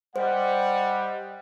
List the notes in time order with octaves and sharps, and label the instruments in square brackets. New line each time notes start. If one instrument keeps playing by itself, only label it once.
[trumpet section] G3 [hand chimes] C5 [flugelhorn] D#5 [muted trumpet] F#5